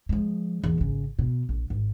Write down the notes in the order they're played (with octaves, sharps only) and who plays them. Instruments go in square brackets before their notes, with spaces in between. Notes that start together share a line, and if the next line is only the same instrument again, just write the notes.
[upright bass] F3 G#3
E2 A#2
G#1 C#3
B2
A#1
G#1